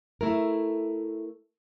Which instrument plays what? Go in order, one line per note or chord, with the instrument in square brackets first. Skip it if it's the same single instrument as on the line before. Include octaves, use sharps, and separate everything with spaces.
[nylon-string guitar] A3 E4 A#4